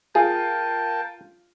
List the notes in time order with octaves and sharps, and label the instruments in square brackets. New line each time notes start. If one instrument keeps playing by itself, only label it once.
[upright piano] F4 [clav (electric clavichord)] G#4 [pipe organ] A#4 G5 A5